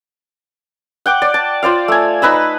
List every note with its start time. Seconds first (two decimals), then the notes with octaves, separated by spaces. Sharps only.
1.06 F#5 G5 D6
1.22 D5
1.34 A5
1.63 F4 C5 D5 F5
1.88 A3 G#5
2.22 D#4 B4 B5 E6